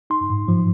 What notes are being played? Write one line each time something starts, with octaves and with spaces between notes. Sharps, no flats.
D#4 C6
G#2
F3